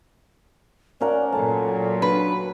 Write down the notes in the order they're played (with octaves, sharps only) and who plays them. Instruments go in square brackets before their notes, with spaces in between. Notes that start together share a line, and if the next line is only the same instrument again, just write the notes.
[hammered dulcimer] C#4 A#4 F#5 [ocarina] D5
[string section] A#2 F#3 [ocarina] A4 [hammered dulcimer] A5
[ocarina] D4 [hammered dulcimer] F#4 [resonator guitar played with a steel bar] B4